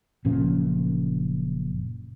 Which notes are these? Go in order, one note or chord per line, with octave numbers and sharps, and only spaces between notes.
F#1 A#2 F3 C#4